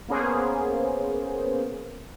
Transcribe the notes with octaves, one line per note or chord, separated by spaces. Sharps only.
A#3 B3 C#4 G#4 C5